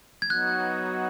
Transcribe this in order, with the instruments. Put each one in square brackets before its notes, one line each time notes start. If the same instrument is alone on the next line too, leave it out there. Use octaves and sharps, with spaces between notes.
[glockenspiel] G#6
[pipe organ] F#3 B3 D#4 F#4 [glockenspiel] F#6